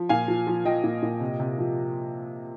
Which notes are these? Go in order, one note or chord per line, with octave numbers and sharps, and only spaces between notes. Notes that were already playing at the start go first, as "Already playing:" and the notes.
Already playing: F3
A#2 F5 G#5
F3
F3
F3 D#5 G5
A#2
A#2
C3
C3
F3